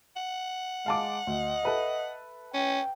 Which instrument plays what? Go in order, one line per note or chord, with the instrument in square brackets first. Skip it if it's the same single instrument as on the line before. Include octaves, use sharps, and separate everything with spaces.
[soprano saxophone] F#5
[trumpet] G#3 [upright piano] F5 A5 D6
[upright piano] D2 [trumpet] D#5
[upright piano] A4 B4 E5
[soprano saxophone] C#4 [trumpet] G5